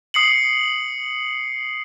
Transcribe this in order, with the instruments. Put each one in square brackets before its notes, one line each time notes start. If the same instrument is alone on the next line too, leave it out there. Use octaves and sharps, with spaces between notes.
[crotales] D#6 C7 C#7 F#7